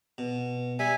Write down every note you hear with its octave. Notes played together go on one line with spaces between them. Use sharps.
B2
G3 E5 G#5